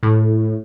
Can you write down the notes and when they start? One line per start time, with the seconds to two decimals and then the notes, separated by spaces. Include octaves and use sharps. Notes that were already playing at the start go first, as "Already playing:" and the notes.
0.03 A2